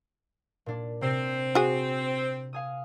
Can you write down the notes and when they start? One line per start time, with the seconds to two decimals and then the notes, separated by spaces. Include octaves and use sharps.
0.66 A#2 D4
1.01 C3 C4
1.55 F#4 G#4
2.53 F5 G#5 D#6